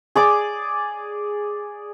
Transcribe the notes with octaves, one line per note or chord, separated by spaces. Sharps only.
G#4 D5 D6